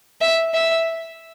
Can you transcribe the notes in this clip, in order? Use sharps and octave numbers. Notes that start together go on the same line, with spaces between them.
E5
E5